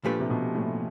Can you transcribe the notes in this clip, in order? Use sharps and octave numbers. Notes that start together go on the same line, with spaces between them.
A#2 F3 A3 D4 G4 B4
C3
B2
A2